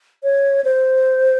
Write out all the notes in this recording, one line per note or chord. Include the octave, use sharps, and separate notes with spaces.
C#5
C5